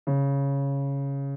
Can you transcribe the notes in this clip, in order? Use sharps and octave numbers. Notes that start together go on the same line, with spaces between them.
C#3